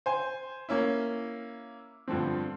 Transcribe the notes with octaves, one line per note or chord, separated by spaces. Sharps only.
C5 G#5
A#3 C#4 E4
G2 D3 F3 C4